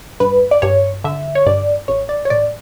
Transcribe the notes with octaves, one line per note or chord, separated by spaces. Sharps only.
G2 B4
D5
G2 C#5
D3 E5
C#5
G2 D5
A1 C#5
D5
C#5
A1 D5